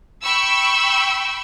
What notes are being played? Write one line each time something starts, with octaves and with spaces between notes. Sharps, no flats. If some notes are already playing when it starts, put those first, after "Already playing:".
G5 B5 C#6 E6